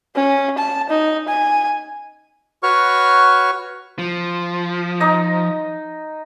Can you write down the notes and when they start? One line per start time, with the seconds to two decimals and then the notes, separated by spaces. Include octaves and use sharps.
0.15 C#4
0.58 A5
0.90 D#4
1.28 G#5
2.63 F#4 B4 C#5 C#6 F6
3.99 F3
5.00 D#4 D#5